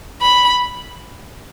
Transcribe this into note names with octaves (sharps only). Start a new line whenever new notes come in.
B5